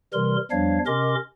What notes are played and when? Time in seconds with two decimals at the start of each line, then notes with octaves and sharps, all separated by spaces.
0.13 C3 E3 G3 A#4 C6
0.51 E2 F3 G3 D4 C#5 F5
0.87 C3 C#4 A#4 D#5 C6 D6